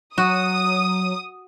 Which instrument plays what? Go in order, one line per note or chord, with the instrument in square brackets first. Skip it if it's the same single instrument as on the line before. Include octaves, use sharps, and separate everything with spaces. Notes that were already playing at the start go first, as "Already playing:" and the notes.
[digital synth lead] F#3 [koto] F#4 [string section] D#6